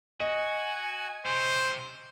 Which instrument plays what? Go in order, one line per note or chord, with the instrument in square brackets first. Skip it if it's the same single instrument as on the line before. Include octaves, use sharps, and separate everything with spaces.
[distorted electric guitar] F#4 [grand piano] D#5 [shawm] G#5
[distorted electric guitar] C3 C#4 [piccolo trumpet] C5